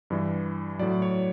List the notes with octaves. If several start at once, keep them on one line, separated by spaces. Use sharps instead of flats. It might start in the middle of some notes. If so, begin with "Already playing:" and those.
G2 E3 G3
A2 F#3 D5
C#5